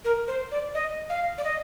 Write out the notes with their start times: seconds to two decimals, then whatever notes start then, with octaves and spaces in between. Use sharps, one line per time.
0.05 A#4
0.28 C5
0.51 D5
0.74 D#5
1.09 F5
1.38 D5
1.44 D#5